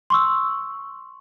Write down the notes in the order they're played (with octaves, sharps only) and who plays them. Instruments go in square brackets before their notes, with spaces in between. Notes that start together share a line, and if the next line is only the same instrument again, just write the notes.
[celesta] C6 C#6 E6